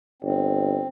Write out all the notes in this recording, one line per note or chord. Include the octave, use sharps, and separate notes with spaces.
G1 C4